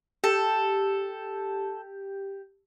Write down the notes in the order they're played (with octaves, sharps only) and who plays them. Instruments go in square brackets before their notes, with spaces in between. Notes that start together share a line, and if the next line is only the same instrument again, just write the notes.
[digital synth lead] G4 [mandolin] A4